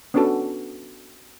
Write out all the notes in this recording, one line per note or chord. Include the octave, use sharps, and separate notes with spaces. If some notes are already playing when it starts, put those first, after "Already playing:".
B3 C#4 D4 F#4 A4